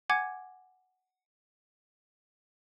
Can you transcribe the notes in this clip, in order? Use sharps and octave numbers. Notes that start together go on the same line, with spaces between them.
F#5 G#5 D6 G#6